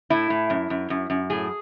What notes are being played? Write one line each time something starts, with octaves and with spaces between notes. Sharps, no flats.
A2 E4
A2
F#2
F#2
F#2
F#2
A2 G#4